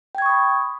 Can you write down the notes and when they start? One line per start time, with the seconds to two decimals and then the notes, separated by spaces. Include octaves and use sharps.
0.15 G5
0.18 G#6
0.22 C#6
0.26 D#6
0.30 B5